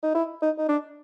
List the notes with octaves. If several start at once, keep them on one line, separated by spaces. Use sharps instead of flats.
D#4
E4
D#4
D#4
D4